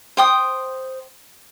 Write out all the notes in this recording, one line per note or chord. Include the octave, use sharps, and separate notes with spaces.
C5 G5 D#6